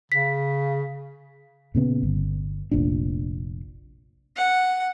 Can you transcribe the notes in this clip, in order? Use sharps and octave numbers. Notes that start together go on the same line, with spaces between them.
C#3 B6
A#2 C#3 B3
G1
F1 A#1 F3 D4
F#5